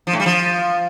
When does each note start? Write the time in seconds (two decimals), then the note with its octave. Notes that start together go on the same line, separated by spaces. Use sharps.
0.07 F3
0.13 A2
0.20 G3
0.26 F3